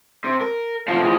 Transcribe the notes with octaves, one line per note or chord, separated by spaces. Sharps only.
C3
A#4
D2 C3 F3 F5 A5
E4 G#4